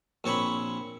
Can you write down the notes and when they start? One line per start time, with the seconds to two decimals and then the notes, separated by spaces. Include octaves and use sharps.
0.24 A#1 C4 C#5 G#5 B5